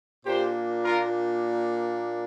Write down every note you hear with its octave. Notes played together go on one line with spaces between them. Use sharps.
A#2 A#3 D4 G4 C5
F4 A#4